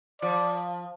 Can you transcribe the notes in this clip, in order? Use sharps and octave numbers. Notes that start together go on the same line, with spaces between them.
F3 D5